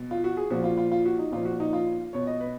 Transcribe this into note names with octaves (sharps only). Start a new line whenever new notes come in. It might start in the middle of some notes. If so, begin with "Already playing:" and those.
Already playing: B2
F4
F#4
G#4
A#2 F3 F#4
F4
F4
F4
F#4
D#4
A#2 F3 F4
F#4
D#4
F4
B2 C#5
D#5
B4